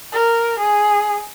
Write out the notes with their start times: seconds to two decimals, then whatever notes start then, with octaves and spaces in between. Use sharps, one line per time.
0.13 A#4
0.60 G#4